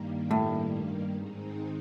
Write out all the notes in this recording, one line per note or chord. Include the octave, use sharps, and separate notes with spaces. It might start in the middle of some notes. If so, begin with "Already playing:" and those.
Already playing: G2 D#3 G3 A#3
A2
G#2 D#3 G#3 C4 D#4